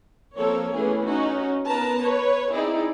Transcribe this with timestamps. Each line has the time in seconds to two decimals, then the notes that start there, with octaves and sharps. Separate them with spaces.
0.36 F3 A#3 C4 A4 A#4 C#5
0.73 E3 A3 B3 C#4 G#4
1.05 C#4 D#4 F#4
1.67 B3 A#4 B4 A5 A#5
2.01 B4 C#5
2.52 C4 D#4 E4 G#4 D5